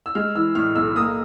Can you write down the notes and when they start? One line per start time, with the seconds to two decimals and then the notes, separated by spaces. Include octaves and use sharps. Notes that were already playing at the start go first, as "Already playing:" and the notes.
0.06 E6
0.15 G#3 F6
0.35 E3 E6
0.55 A2 F6
0.75 B1 E6
0.96 A#3 D#6